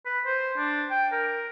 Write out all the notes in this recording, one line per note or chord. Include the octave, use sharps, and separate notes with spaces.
B4
C5
D4
G5
A#4